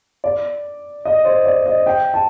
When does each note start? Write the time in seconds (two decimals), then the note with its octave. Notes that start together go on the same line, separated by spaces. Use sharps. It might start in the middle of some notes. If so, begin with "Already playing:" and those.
0.24 D5
1.05 D#5
1.25 C5
1.46 D5
1.66 D#5
1.86 G5
2.14 A5